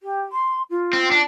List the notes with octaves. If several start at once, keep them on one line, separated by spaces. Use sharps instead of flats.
G4
C6
F4
C4
D4